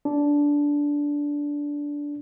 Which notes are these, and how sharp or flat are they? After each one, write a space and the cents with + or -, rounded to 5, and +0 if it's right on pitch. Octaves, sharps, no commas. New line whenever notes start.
D4 -15